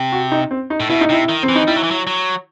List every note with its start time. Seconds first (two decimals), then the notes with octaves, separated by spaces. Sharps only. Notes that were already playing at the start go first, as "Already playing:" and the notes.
Already playing: C3
0.12 F#4
0.32 D#4
0.51 C4
0.70 D#4
0.80 A2
0.90 B2 E4
1.01 D#4
1.09 C3 E4
1.29 D#3
1.43 C4
1.49 E3
1.55 D#4
1.67 G3 E4
1.76 F#3
1.83 E3
1.91 F#3
2.07 F#3